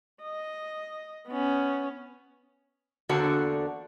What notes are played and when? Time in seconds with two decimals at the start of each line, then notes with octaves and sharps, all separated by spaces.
0.23 D#5
1.28 B3 C#4
3.09 E2 D3 A#3 D4 F#4 C5